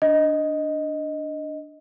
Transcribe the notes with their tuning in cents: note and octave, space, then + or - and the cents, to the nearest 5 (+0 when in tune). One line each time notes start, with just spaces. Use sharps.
D4 +0 D#5 +0